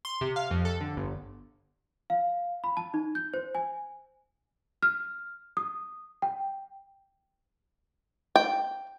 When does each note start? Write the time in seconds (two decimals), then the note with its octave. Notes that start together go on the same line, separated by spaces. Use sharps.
0.05 C6
0.21 C3
0.36 F5
0.51 F2
0.65 A4
0.81 D3
0.96 G1
2.10 F5
2.64 B5
2.77 A5
2.94 D#4
3.15 G6
3.34 C5
3.55 G#5
4.83 F6
5.57 D#6
6.22 G5
8.36 G5